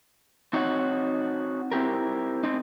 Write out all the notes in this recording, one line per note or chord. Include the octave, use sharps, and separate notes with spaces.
C4 D#4 F#4 C#5 F5 F#5
C4 E4 G4 A#4
C4 D#4